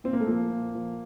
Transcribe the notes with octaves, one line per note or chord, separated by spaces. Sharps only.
A#2 C4
A#3
A3
F3 A#3
A#2
F3